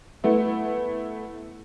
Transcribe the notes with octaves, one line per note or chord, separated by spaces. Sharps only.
A3 B3 E4